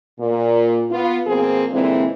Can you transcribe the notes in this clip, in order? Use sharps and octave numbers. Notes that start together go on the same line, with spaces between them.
A#2
B3 F4
B2 F3 A#3 C4 G#4
A#2 D3 E3 G#3 C4